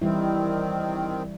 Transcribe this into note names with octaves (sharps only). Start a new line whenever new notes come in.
D#3 E3 G3 C4 E4